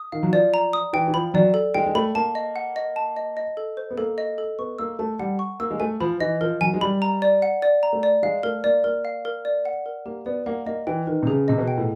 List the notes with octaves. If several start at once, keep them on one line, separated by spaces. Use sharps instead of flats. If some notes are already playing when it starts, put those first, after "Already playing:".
Already playing: D#6
D#3 F5
F#3
F3 D5
A#5
D#6
E3 G5
E3
F3 B5
F#3 D5
A4
G#3 G5
G#3
A3 B5
A#3 A5
D#5
F#5
D#5
A5
D#5
D#5
A4
C5
B3
A#3 A4
D#5
A4
B3 C#6
A#3 E6
A3 A5
G3 F#5
C#6
A#3 E6
G#3
A3 G#5
F3 B5
E3 D#5
F3 A#4
F#3 G#5
G#3
G3 B5
A#5
D5
F#5
D5
A#5
A3
D5
G#3 F5
A3 A#4
A#3 D5
A#3 A#4
F5
A#4
D5
F#5
A#4
A#3 G4
B3 D5
A#3 F#5
A#3 D#5
E3 G5
D#3 B4
C3
C#3 G#4
C3 D#5
B2
G5
A2